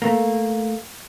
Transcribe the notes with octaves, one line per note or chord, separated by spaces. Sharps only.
A3 A#3